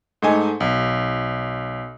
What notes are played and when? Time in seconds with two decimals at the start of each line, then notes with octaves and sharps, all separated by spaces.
0.22 G#2 A3 D#4 G#5
0.60 B1